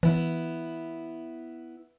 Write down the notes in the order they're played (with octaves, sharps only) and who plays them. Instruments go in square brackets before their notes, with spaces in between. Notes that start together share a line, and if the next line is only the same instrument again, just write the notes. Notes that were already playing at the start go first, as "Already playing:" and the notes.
[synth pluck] E3 [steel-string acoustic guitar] B3 E4